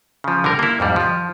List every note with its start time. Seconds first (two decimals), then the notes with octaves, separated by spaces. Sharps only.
0.24 C#3 F3
0.44 D3 G3 A#4
0.59 A#3 E4
0.80 F2 G#2 G3
0.96 F3